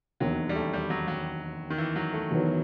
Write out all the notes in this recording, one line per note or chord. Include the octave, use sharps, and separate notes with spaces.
E1 D#2 D#3 F#3
G3
A3
G3
F#3
F#3
D#3
E3
F#3
A3
E1 E2 D#3 F#3 B3